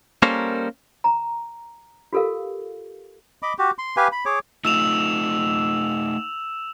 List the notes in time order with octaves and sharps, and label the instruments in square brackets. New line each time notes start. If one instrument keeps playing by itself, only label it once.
[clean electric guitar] G3 A#3 C#4 A4 A#4 C5
[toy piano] A#5
F4 G4 A4 A#4 F5
[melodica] D#5 B5 D6
F#4 G4
C6
G4 B4 F5 G#5
B5
G#4 C#5 D6
[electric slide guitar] A3 D#4 F4 [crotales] E6 E7 F7